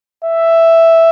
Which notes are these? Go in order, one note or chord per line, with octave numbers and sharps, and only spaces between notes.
E5